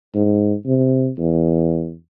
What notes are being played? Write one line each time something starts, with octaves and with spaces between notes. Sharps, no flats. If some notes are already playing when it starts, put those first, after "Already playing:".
G#2
C3
E2